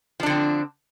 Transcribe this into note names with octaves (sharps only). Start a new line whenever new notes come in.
D3 F3 C4 D4